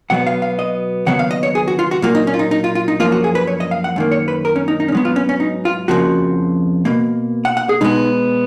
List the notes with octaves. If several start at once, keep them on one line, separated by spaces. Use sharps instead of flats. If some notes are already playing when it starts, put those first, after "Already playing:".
B2 F#3 B3 F#5
F5
F5
D#5
D#2 C#3 F#3 B3 F#5
F5
D#5
C#5
G#4
F#4
F4
F#4
A#2 F#3 A#3 F4
D#4
C#4
F4
D#4
D#4
F4
F4
D#4
F#2 F3 A#3 F4
F#4
G#4
B4
C#5
D#5
F5
F#5
F#2 D#3 A#3
C#5
B4
A#4
C#4
D#4
D#4
C#4
G#2 F#3 B3 D#4
F4
C#4
C#4
D#4
F4
F2 C#3 F3 A#3 F#4
B2 A#3
F#5
F#5
G#4
B2 G#3 B3 D#4